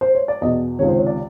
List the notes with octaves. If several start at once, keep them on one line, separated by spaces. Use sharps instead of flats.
C5
C#5
D5
E2 B2 D#5
C#2 C3 D#3 C#5
C5
C#5
D5